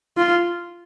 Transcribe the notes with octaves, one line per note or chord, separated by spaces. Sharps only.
F4